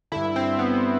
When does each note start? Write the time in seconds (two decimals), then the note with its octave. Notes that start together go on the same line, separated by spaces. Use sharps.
0.12 G2 D3 E4
0.36 C4
0.59 B3